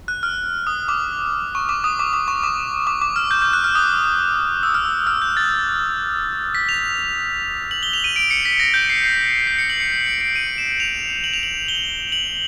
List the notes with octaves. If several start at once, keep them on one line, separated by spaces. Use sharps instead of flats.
F#6
F6
D#6
D6
C#6
D6
D#6
D6
D6
C#6
D6
D6
D6
F6
G6
G6
F#6
F6
D#6
E6
F6
E6
F6
G6
A6
B6
F7
F#7
G7
F7
D#7
D7
C#7
B6
A#6
G6
C7
C7
C7
C#7
F#7
C#7
C7
D7
D7
D#7
E7
F7
F#7
F7
F#7
G7
F#7